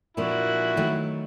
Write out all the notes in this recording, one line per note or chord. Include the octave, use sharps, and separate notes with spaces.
A#2 F3 A#3 D4 E4 F#4
D#3 F#3 A3